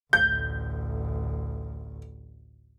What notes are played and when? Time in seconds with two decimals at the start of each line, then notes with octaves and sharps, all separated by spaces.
0.13 A1 D2 G6